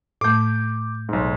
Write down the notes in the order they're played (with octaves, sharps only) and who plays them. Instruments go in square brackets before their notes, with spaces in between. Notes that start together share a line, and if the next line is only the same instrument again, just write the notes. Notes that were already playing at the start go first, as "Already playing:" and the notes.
[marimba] A2 A3 [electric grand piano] D6 G6
[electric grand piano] B1 G#2